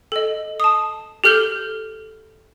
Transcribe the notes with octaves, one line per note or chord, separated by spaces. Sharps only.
A4 D#5
A5 D#6
G4 A4 F6 G6 G7